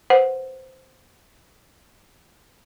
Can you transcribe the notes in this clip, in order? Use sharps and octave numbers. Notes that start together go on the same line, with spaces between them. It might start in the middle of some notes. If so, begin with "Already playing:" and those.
B4 C5 F#5